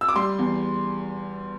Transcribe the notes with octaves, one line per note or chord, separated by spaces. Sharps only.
E6
D6
G3 C6
E2